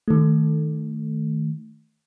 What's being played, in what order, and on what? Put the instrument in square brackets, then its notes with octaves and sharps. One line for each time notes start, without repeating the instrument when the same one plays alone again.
[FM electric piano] D#3 A3